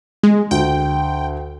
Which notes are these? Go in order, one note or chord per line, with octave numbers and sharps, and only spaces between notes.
G#3
D2 G5